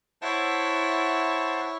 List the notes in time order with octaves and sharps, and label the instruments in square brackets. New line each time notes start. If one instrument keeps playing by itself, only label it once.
[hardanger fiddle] E4 C#5 [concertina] C5 F#5 A5